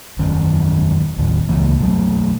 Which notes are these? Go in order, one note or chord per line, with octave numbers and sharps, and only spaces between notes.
E1 F#2 D#3 C#4
D#2 A2 D#3
C#2 F#2 E3 A#3
B2 F#3 A3